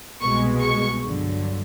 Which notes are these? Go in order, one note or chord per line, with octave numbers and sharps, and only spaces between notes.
C2 B2 G#3 C#6
C#6
G2 D3 F#3